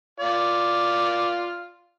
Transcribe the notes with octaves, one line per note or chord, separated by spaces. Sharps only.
F4 D5